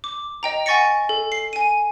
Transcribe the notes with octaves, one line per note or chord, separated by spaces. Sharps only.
D6
D#5 G5 A#5
F#5 G#5 C#6 A6 A#6 C#7
A4
C7
G#5 D#7